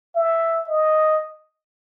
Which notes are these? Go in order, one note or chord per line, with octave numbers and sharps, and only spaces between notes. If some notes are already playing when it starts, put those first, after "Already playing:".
E5
D#5